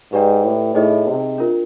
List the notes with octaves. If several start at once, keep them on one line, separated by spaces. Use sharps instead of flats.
G#2 G4 B4 D5 G5
A2
A2 D#4 G#4 C5 D#5
C3
D4 F4 A#4